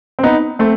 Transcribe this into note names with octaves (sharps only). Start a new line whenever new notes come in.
C4
B3 D#4
A3 C4